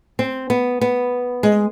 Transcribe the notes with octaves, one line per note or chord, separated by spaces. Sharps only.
C4
B3
B3
G#3